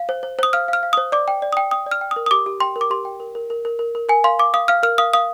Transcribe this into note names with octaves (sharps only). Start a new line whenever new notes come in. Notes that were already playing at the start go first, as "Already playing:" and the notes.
Already playing: F5
C5
C5
C5 D#6
F5 F6
F5 F6
F5
C5 D#6
D5 D6
G5
D5
G5 D#6
G5 D#6
D5
F6
G5
D#6
A#4
D#6
G4 D6
G4
G5 C6
A#4
D6
G4 C6
G5
A#4
A#4
A#4
A#4
A#4
A#4
A#4 G#5
F5 C6
F5 D6
F5 D#6
F5 F6
A#4 F6
F5 D#6
F5 D#6